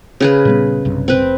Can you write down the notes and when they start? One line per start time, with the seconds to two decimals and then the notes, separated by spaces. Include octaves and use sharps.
0.20 C#3 G#4 B4
0.45 A#2 G3 B3
0.85 B1 G2 C3
1.08 C4 B4
1.22 F1